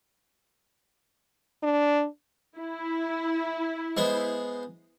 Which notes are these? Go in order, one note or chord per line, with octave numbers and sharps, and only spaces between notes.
D4
E4
G#3 B3 C5